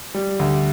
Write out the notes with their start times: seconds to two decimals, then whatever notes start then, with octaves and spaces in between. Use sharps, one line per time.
0.14 G3
0.39 D2